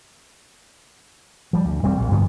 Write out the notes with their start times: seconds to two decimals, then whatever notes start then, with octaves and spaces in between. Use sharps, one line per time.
1.53 F3 G3
1.65 D2
1.83 E1 G3 C4
2.00 A#1
2.12 G2 D3 F3 B3